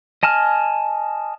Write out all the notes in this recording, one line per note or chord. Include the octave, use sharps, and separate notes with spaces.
D#5 G#5 A5 F6